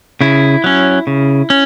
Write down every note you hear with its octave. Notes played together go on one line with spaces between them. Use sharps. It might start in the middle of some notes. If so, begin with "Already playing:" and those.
C#3 E4
F#3 C#4
C#3
C#4